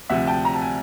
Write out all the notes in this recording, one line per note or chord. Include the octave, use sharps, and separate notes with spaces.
D2 C3 F3 E5 F#5
G5 A5
A#5
A5
G#5